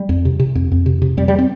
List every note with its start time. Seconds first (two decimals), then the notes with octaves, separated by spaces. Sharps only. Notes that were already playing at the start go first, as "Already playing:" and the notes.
Already playing: G3
0.09 F2
0.25 C3
0.39 C3
0.55 F2
0.72 F2
0.86 C3
1.02 C3
1.17 F2 G3
1.28 G3
1.39 C4